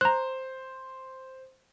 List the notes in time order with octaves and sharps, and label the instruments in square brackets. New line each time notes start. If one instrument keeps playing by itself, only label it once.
[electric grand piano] C5 [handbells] A#5 F#6